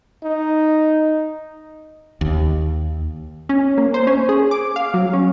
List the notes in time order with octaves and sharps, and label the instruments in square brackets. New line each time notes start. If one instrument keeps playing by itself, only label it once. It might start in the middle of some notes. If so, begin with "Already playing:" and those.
[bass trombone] D#4
[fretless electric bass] D#2
[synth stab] C#4
A#3
C5
C#4
G#4
D6
F5
F#3
C#4